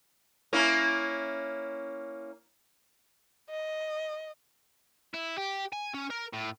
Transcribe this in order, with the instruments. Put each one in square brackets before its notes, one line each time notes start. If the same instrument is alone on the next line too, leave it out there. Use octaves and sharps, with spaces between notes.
[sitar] A#3 C#4 E4
[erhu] D#5
[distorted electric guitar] E4
G4
G#5
C#4
A#4
A2